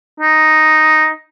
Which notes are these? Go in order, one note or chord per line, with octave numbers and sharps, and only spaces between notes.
D#4